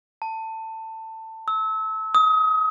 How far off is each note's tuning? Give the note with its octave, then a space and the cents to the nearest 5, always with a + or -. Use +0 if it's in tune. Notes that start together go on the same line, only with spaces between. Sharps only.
A5 +20
E6 -30
D#6 +30